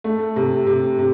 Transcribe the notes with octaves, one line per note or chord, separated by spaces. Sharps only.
A3
C3
C3
C3